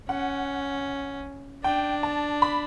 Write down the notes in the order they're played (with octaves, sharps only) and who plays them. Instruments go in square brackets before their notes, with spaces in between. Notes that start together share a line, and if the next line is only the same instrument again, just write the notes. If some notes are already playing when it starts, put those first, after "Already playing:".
[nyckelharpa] C#4 [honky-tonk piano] F#5
[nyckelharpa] D4 [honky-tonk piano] G5
[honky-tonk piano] A5
B5